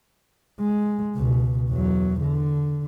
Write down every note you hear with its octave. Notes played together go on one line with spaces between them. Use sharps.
G#3
C#2 B2
E2 F#3
D3